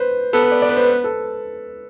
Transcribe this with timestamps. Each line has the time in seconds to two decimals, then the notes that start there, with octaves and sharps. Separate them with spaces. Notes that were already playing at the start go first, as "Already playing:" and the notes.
Already playing: B4 C5
0.33 B3 A4
0.43 B4
0.51 D5
0.62 D5
0.69 B4
0.76 C5
0.89 B4
1.04 A4